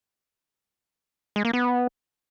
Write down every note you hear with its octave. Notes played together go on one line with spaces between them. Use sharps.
G#3
A#3
B3